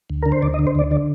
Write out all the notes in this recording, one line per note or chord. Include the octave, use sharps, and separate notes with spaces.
D2
D3 A#4
C5
D2 D5
D#5
D3
C5
D2 D5
D3 D5